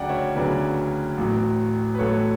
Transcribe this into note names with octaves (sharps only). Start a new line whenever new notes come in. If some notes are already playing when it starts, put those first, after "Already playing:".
Already playing: D2 C#3 F#3 D5 F#5 G5
C#5 E5
D2 C#3 F#3 B4 D5
A1 A2 F#3
B4
A1 A2 F#3 A4 C#5